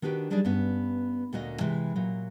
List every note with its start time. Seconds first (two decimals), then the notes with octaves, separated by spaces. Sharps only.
0.02 D#3 D4 F#4 G4 B4
0.30 F#3 G3 D4 D#4 G#4 D5
0.45 G2 B3 C#4
1.33 D2 A#2 D3 F#4 A#4 D#5
1.61 C3 E3 G#3
1.96 A#2 F#3